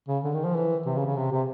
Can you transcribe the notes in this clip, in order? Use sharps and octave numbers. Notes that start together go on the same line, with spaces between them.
C#3
D3
D#3
F3
E3
C3
C#3
C#3
C3
C3